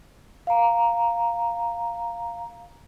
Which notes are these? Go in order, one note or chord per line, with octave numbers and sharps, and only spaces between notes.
F5 A#5